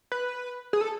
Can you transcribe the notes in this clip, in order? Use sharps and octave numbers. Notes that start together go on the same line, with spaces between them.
B4
G#4
A4